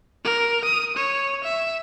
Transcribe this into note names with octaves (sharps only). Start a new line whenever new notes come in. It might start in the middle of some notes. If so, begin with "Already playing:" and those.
A#4
D#6
C#5
E5